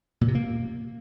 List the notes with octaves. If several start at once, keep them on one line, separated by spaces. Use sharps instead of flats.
A#2
C3
A#3